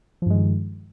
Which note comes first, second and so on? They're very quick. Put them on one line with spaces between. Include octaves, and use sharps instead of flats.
F3 G2 G#3 D#3